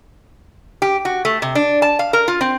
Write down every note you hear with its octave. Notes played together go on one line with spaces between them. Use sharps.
G4
F#4
A3
C3
D4
A5
F5
A#4
F4
C4